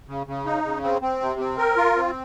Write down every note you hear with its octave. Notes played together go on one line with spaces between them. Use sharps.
C#3
C#3
D#4
C#3
C4
C4
C3
C4
A#4
F4
C4